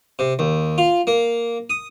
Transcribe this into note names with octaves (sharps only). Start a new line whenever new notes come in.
C3
D#2
F4
A#3
D#6